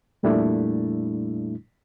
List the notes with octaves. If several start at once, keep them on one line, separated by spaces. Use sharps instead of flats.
F2 A#2 G3 A3 D4 E4